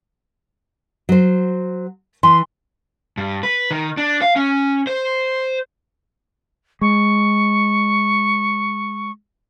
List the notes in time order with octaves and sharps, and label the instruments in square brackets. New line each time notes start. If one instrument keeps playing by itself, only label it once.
[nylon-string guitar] F#3 C5
[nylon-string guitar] E3 [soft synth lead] C6
[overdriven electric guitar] G2
B4
D#3
D4
F5
C#4
C5
[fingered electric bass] G#3 [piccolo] C#6